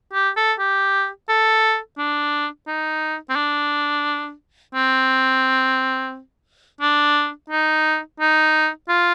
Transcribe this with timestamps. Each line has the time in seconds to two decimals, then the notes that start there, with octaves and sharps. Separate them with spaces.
0.13 G4
0.37 A4
0.59 G4
1.29 A4
1.98 D4
2.67 D#4
3.30 C4
3.36 D4
4.74 C4
6.81 D4
7.50 D#4
8.20 D#4
8.89 F4